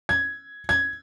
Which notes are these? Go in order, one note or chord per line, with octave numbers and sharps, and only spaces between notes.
G#6
G#6